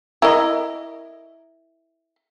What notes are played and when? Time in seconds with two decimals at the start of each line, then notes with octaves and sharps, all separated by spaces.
0.22 E4 A#4 D#5